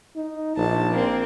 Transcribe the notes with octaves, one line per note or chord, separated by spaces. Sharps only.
D#4
A#1 A5
A#3 C4